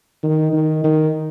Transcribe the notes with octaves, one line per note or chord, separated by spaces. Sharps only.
D#3
D#3
D#3